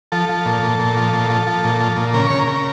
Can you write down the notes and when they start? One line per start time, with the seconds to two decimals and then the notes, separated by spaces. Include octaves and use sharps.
0.12 F3 A4
0.29 F3
0.46 A#2
0.63 A#2
0.79 A#2
0.96 F3
1.13 A#2
1.30 F3
1.47 F3
1.64 A#2
1.80 F3
1.96 A#2
2.14 C#3 A#4
2.26 C#3 C#5
2.39 A#4
2.48 C#3